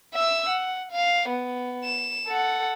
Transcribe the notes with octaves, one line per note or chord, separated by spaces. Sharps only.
E5 E6
F#5
F5
B3
E7
A4 F#5